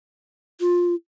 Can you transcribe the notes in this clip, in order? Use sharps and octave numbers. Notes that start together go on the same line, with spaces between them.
F4